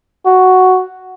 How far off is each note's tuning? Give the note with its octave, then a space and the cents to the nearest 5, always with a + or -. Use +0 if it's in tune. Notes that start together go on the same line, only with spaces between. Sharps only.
F#4 +5